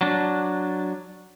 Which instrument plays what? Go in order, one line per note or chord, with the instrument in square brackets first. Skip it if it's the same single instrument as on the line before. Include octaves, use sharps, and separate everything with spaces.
[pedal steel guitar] F#3 D4